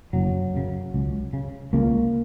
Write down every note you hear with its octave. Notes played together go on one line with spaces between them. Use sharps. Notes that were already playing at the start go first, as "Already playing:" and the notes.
F#1 F#3
F#2 C#3
C#2
C#3
C#2 A#3